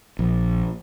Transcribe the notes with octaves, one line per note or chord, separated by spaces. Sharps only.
A#1